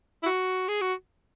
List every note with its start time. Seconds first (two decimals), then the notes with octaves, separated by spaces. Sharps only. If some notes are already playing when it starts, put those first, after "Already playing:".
0.23 E4
0.26 F#4
0.68 G#4
0.81 F#4